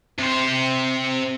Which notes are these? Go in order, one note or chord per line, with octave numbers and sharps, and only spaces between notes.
C3 C5